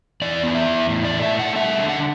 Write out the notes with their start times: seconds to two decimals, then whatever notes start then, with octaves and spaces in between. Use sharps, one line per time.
0.22 E2 D5
0.43 B3
0.55 E5
0.67 E2
0.89 A2
1.05 D5
1.11 A3
1.22 E5
1.33 A3
1.39 F#5
1.55 G3 E5
1.78 D3
1.89 F#5